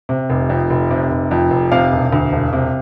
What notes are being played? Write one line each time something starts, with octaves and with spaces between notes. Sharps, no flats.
C3
F1
F2
F1
C3
F1
F2
F1
C3 F5
E1
D2
E1
C3